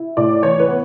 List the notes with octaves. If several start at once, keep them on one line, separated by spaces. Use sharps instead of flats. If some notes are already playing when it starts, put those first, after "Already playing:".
Already playing: E4
A2 D5
E3 C#5
B4
B3